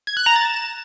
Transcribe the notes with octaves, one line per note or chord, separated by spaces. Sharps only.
G#6
F#6
A#5
A6
E7